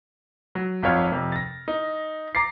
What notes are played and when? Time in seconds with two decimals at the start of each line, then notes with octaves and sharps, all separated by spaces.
0.55 F#3
0.83 G#1 F2 F4 C#5 F6
1.12 F2 C3
1.32 A6 A#6
1.68 D#4
2.35 A#5 D6 A6 C7